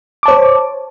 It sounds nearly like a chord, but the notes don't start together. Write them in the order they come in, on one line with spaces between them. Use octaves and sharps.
D6 A5 C#5 C5